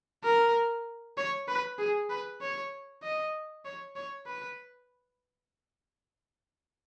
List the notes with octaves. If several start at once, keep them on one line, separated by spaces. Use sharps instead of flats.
A#4
C#5
B4
G#4
B4
C#5
D#5
C#5
C#5
B4